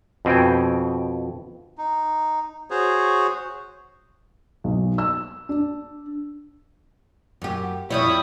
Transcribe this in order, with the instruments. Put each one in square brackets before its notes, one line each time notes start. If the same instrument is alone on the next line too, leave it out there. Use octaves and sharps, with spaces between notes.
[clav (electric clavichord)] F2 B2 C4 G5 G#5
[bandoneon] D#4
F#4 G#4 C5 C#5
[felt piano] B1
E6
D4
[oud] F#2 G4
[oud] F2 G3 C#5 [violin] E4 D#6